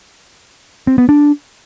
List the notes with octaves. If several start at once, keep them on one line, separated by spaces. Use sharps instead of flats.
C4
B3
D4